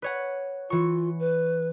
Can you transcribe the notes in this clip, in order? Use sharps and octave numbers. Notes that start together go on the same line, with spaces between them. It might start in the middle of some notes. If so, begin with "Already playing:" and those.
B4 C#5 F#5
E3 F4 C#6
B4